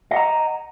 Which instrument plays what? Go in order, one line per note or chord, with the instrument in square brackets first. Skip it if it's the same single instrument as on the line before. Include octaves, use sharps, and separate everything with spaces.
[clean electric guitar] D#5
F#5
A#5